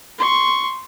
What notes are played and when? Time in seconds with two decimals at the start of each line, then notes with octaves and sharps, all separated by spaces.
0.18 C6 C#6